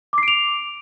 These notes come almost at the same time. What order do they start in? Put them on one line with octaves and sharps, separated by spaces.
D6 C7 D7 F7